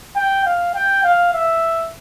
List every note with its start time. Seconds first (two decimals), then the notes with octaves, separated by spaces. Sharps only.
0.15 G5
0.45 F5
0.74 G5
1.04 F5
1.33 E5